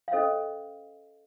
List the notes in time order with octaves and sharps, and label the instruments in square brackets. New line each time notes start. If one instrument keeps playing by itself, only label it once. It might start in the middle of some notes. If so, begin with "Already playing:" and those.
[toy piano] F5
C#4 A4 C5 D#5